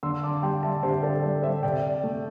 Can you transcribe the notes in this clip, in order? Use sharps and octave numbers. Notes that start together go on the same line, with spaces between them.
D3 C6 E6
A5 D6
G3 G5 C6
E5 A5
D3 G4 C5
A4 D5
G3
C5 E5
C3 D5 G5
A3